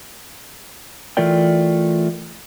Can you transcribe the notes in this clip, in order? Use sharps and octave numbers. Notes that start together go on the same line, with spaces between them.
E3 A3 F4 A#4 D5 G5